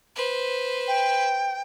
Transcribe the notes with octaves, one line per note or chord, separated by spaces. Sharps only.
B4 C5
G5